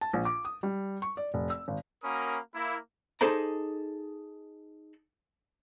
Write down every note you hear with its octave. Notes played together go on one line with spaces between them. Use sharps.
A5
A#1
D6
D#6
G3
C#6
D5
F1
E6
G#1
A#3 C#4 F#4 A#4 B5 D#6
A#3 E4
D#4 G#4 A4 C5 D5 A#5